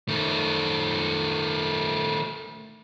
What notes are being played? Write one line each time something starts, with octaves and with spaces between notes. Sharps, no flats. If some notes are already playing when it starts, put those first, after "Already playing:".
D#3 A3